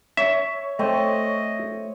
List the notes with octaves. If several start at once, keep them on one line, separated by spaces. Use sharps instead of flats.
C#5 E5
A3 C4 C#5 D#5